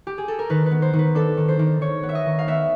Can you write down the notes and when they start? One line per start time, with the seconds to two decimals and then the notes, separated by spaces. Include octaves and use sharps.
0.07 G4
0.18 G#4
0.28 A4
0.39 A#4
0.50 D#3 B4
0.66 B3 B4
0.82 C5
0.93 D#3
0.99 B4
1.15 D4 A4
1.37 D#3
1.48 C5
1.59 D#3
1.81 D#3 C#5
2.03 B3
2.09 E5
2.15 D#5
2.26 D#3
2.39 F5
2.48 B3 E5